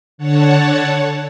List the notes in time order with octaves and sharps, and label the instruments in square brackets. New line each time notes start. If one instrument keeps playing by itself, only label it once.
[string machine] D3 C#5 F#5 A5